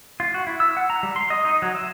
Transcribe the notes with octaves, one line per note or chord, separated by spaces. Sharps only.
F4
F#4
E4
E6
F#5
A#5
G3
C6
D#5
D#4
F#3
E5